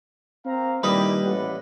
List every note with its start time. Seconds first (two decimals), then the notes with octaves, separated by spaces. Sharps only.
0.45 A#3 C4 F5 A#5
0.83 A#2 D#3 G3 E4 G4 B4 D#5
1.25 A1 E4 D5 F#5